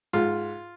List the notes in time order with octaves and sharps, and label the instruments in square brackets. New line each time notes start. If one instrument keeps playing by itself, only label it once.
[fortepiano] G#2 F4